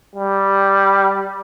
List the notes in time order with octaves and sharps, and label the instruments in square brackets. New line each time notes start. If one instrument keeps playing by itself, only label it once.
[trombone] G3